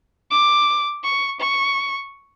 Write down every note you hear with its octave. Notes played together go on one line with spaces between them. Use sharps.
D6
C#6
C#6